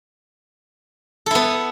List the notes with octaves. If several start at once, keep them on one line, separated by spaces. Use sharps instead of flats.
B3 E4 A4